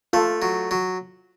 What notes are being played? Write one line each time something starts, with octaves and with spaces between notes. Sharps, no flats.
A3 F4 A4
F#3
F#3